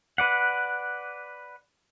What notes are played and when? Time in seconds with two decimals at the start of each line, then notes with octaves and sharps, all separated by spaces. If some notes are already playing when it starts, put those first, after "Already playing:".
0.18 B4 D5 F#5